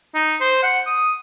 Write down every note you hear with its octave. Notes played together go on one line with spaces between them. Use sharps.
D#4
C5
F#5
D#6